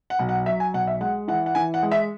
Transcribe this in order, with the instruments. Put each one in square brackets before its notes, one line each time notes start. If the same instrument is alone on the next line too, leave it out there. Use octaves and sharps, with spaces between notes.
[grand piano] F#5
B1
F#5
F#3 E5
G#5
B1 F#5
E5
G#3 F#5
E3 F#5
F#5
E3 G#5
F#5
G#3
E5